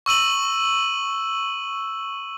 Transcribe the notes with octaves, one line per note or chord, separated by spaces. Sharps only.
C#6 E6 D#7 F#7